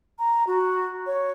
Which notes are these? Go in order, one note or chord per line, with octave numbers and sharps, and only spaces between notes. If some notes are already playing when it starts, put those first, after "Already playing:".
A#5
F#4
C#5